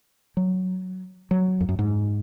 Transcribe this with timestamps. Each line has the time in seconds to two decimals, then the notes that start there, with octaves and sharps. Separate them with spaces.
0.37 F#3
1.31 F#3
1.61 F2
1.69 F#2
1.79 G#2